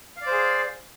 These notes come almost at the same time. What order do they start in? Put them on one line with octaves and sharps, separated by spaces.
F5 D5 C5 G#4